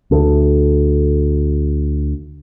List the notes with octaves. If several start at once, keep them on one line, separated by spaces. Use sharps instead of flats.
D2 D3